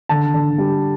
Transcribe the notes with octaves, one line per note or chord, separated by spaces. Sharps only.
D3 A5
D3
G3